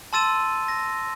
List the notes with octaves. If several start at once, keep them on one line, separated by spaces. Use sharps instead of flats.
A5 C6 E6 A6 D#7 E7
A#6